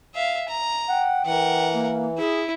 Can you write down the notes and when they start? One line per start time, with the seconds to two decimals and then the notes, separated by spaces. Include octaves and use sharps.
0.15 E5 F5
0.49 A#5
0.89 F#5 G5
1.25 E3 A#4 F#5
1.73 A#3
2.18 E4 G#4